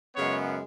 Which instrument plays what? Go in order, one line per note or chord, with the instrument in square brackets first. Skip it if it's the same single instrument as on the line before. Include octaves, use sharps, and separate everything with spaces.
[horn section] F#2 C#3 G#3 B3 C#5